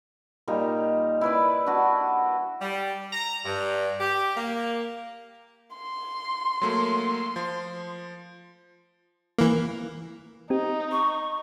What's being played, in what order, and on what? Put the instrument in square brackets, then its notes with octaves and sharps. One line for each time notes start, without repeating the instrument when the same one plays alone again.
[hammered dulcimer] A#2 G3 D#4
E4 B4 D5
D4 F#4
[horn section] G3
A#5
G2
G4
A#3
[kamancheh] C6
[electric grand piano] F#3 A3 A#3
F3
[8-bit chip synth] E3 A#3
[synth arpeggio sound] C4 G4 [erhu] D#4
[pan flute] C#6